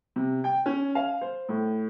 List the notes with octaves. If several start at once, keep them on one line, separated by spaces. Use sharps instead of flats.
C3
G5
C#4
F5
C5
A2